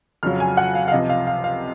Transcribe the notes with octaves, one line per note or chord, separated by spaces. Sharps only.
F2 C#3 F#3 F6
G#5
F#5
F5
F5
C#2 C3 F3 D#5
F5
F5
F5